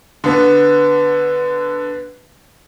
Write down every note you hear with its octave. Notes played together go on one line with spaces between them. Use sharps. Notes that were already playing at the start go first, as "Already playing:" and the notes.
D3 B3